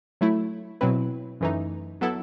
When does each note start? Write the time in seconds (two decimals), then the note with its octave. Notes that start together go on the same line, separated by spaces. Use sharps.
0.21 F#3 A3 E4
0.81 B2 F#3 C4 E4 B4
1.41 F#2 E3 A3 D#4
2.01 F#3 B3 E4 A4